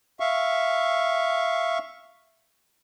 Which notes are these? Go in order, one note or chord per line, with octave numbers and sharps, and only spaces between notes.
E5 F5 C#6